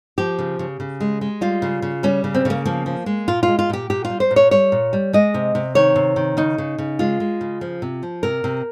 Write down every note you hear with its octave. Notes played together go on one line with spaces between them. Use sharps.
F3 G4
C#3
C#3
C#3
G#3
G#3
G3 F4
C#3
C#3
G3 C#4
C#3
C4
C#3 A#3
F3 A#3
F3
G#3
A#2 F4
F4
G#3
F4
A#2 G4
A#2 G4
F4
G3
C5
A#2
C#5
G3 C#5
A#2
G3
G#3 D#5
C3
C3
D#3 C#5
C3
D#3
C#3 D#4
C#3
C#3
G#3 F4
G#3
C#3
F3
C3
F3
C3 A#4
C3